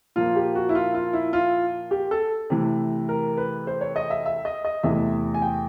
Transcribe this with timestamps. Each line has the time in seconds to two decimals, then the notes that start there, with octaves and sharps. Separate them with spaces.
0.16 A#2 F3 A#3 F4
0.36 G4
0.55 F#4
0.69 E4
0.75 F4
0.94 F4
1.13 E4
1.33 F4
1.91 G4
2.11 A4
2.50 C3 E3 A3
3.09 A#4
3.37 B4
3.67 C5
3.81 C#5
3.96 D#5
4.10 E5
4.26 E5
4.45 D#5
4.65 D#5
4.83 E2 C3 E3 A3 E5
5.34 G#5
5.42 G5